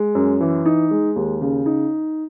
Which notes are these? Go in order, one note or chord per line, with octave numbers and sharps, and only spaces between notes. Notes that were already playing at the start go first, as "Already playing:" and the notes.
Already playing: G#3
F#2
E3
D#4
G#3
D#2
C#3
D#4